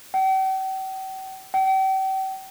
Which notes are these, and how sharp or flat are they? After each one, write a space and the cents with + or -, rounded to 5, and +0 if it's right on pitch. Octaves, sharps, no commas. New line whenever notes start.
G5 -45
G5 -40